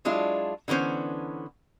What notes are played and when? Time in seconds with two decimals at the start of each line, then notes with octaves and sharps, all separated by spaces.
0.05 F#3 G#3 D4 E4 F4
0.68 D3 E3 B3 C#4 C5